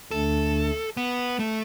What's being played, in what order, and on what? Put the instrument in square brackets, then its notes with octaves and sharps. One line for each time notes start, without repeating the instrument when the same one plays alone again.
[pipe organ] D2 D3 A3 D4 [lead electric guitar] A4
[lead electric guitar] B3
A3